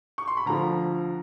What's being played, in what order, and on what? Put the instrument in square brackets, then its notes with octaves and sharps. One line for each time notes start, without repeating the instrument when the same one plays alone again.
[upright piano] C#6
C6
B5
D2 D3 F3 A#5